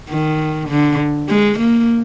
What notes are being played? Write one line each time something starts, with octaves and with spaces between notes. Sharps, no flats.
D#3
D3
G#3
A#3